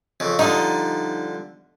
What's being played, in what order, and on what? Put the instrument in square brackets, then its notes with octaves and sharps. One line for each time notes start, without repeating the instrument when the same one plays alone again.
[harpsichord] F2 C#3
[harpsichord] D3 F3 G3 [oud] D#4